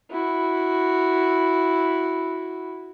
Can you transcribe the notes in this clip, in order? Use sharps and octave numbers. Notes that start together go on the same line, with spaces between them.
E4 F#4